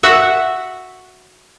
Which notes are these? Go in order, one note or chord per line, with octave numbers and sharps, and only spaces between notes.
F#4 E5 F#5